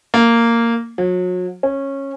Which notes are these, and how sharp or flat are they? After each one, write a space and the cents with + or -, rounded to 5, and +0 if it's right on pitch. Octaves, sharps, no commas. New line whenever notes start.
A#3 -10
F#3 -35
C#4 -15